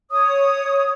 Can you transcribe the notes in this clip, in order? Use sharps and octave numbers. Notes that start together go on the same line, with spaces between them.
C#5 D#6